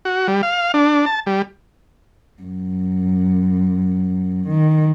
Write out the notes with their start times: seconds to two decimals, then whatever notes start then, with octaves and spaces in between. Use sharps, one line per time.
0.05 F#4
0.28 G3
0.43 F5
0.74 D4
1.06 A5
1.26 G3
2.43 F#2
4.48 D#3